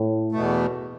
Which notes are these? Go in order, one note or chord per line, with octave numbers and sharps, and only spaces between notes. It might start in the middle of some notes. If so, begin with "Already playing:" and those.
Already playing: A2
E2 B2 A3